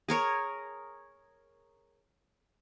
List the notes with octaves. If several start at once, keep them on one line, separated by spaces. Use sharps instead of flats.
G#4 A#4 C#5